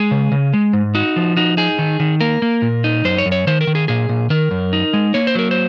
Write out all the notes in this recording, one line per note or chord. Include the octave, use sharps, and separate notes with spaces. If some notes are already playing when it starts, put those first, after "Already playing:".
Already playing: G#3 G#4
C#3
C#3
G#3
G#2
D#4 F#4
F3
D#4 F#4
D#4 G#4
D#3
D#3
A#3 A#4
A#3
A#2
D#4
F#2 C5
C#5
F#2
C#5
D#3 C5
A#4
D#3
G#4
A#2 G#4
A#2
D#3 A#4
F#2
D#4
G#3
A#3 C#5
C5
F#3 A#4
C5